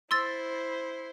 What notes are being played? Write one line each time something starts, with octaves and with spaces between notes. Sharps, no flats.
E4 C5 C6 E6 A6